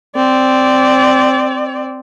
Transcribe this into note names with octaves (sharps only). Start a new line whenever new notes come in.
C4 D5